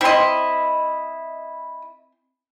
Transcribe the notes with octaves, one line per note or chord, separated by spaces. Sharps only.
C4 E4 D#5 C6